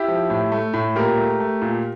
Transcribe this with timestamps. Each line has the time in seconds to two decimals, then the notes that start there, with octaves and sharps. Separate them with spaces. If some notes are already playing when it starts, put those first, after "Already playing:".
Already playing: E4 G4
0.08 F3
0.30 A2
0.52 A3
0.74 A2
0.96 A#2 G4 A#4
1.18 A3
1.40 A3
1.62 A#2